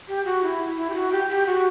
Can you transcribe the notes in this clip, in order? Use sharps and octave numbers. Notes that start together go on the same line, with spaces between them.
G4
F#4
E4
E4
G4
F#4
G4
G4
F#4